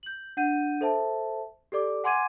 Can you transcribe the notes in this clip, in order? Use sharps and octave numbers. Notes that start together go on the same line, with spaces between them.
G6 F#7
D4 F#5 G6 D#7
A4 C5 E5 A5
G4 A4 D5 D6
F#5 G#5 C6 D6 G#6 D#7